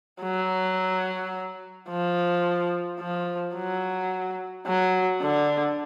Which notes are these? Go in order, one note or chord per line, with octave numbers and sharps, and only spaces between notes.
F#3
F3
F3
F#3
F#3
D3